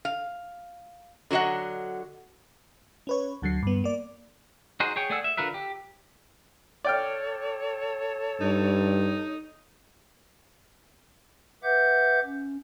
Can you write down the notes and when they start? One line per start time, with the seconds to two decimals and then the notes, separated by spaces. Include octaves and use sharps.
0.05 F5
1.31 D3 F#3 F#4 D#5 F#5
3.07 C#4 B4 C#5
3.42 D2 D3 F#3 C7
3.63 G2 B3
3.84 A#3 D5
4.80 D#4 F#4 G#4 C5
4.96 G#4 C#5 G5
5.10 A3 G#4 D5 F#5 E6
5.24 E5
5.37 D3 F4 A#4 B4 E5
5.54 G4
6.84 A4 C#5 D5 G5 F6
8.41 G2 D#4
11.63 B4 E5 F#5 D6 G6
12.24 C#4